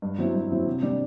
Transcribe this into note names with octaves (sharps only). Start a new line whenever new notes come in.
G2
F#3 C4 E4
G2
F#3 C4 E4
C3
G3 D4